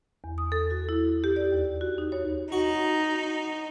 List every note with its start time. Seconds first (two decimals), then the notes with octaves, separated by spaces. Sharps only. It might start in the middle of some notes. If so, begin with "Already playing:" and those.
0.24 E2
0.38 D#6
0.52 A4
0.71 F#4
0.89 E4
1.24 G4
1.36 D5
1.52 D#2
1.81 F#4
1.98 D#4
2.12 C#5
2.52 D#4 F#4